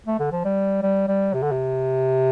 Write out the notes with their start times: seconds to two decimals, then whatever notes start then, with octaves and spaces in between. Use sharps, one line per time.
0.06 A3
0.19 D3
0.32 F3
0.45 G3
0.83 G3
1.08 G3
1.34 C3
1.43 D3
1.52 C3